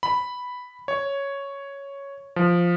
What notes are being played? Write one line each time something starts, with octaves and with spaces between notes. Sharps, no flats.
B5
C#5
F3